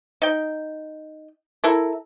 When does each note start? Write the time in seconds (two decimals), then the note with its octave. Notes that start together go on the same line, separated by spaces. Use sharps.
0.22 D#4 G5
1.64 E4 A4 A#4